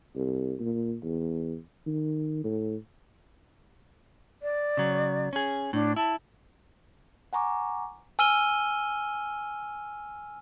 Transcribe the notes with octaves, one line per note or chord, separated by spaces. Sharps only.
C2
A#2
E2
D#3
A2
D5
C#3 F#3
C#4 G#4
A2 D4
E4 A5
F#5 G#5 A#5 C#6 D6
G#5 E6 F6 D#7 G7